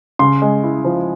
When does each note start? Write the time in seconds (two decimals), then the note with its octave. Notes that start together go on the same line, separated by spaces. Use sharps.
0.19 C#3 C6
0.42 G#3
0.63 E4
0.85 F3